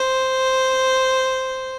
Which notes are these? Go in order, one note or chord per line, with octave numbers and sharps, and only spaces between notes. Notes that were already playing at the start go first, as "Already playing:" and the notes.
Already playing: C5